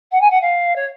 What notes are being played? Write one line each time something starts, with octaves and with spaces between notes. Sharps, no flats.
F#5
G#5
F#5
F5
C#5